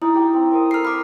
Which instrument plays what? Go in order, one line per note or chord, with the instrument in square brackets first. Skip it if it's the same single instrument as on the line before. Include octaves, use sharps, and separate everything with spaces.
[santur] D#4 [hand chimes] E4
[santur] G4 G5
C4
A#4 F5 D#6
[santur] A4 A#4 [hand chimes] F6 C7
[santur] F5 [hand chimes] B5 D6